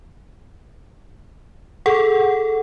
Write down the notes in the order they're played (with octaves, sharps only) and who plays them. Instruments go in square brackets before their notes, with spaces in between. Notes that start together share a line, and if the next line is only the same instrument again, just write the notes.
[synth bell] G#4 A4 F#5